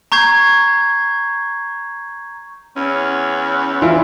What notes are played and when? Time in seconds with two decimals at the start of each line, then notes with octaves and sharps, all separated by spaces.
0.12 A#5 C#6 G6 G#6 C7
2.76 E2 C#4
3.82 E3 D4 E4 F4